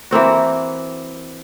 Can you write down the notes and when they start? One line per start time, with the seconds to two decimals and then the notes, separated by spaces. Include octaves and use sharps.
0.11 E3 A#3 C4 F#4